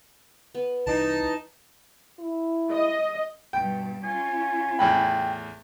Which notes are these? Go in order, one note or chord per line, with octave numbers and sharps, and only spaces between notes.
B3
C2 E3 D#4 A5
E4
D#5
G2 B2 G5
C#4 F4 G#5
E2 A2 G5 B5